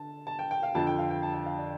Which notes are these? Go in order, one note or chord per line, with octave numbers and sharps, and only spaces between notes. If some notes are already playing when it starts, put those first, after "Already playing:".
Already playing: D3 A5
A5
G5
G5
F5
F2 D3 A5
G5
F5
G5
A5
G5
F5
D5